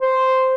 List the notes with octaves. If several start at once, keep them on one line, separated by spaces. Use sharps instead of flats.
C5